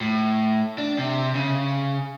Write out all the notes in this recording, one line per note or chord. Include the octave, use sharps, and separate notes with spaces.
A2
D4
C3
C#3